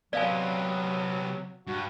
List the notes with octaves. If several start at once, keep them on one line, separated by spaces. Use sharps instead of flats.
C3 F#3 B3 D5 F5 G#5
G2 F#4